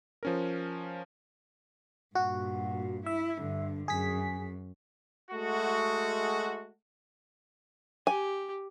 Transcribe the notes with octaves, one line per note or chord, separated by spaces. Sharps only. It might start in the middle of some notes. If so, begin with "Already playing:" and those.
F3 C#4 A#4
G2 A#2 F#4
E4 E5
G2 D3
F#2 G#4 B6
G#3 A3 F#4
G4 G#5